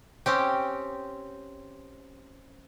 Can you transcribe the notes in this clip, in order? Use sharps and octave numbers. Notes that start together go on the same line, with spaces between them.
C4 C#4 G4